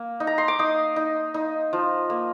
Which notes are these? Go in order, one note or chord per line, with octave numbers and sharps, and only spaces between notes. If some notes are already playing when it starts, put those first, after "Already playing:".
Already playing: A#3
D#4
A#5
C6
D6
D#4 D#6
D#4
D#4
F3
A#3